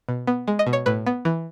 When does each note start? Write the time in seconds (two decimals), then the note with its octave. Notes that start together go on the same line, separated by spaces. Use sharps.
0.09 B2
0.27 B3
0.48 G#3
0.59 D#5
0.67 B2
0.73 C#5
0.86 A2 B4
1.06 B3
1.25 E3